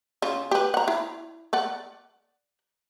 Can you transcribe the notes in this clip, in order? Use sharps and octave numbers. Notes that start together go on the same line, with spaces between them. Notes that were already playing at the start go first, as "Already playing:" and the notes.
C#3 F4
G4 B4
F#5 A#5
E4
A#4 D5 F#5